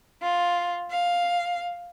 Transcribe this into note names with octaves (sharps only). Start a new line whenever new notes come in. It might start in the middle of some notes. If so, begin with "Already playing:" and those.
F4
F5